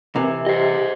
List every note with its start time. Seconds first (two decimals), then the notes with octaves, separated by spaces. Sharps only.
0.16 C3 E3 A#4
0.47 G4 C5 D#5